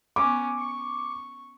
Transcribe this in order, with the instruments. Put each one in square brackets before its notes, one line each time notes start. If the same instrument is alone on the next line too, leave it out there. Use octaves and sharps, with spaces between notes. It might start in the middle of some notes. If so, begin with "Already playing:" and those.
[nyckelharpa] B3 C#4 [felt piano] D6
[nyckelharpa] C#6